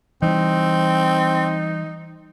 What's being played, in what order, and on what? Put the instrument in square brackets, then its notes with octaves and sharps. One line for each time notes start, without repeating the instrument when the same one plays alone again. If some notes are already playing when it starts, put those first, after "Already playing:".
[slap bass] E3 G3 [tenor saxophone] C4 [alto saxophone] D#4